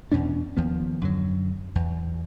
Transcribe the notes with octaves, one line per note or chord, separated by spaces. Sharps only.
E2 B2 C#4 D4
D#2 F3 B3
F#2 D3 F#3
E2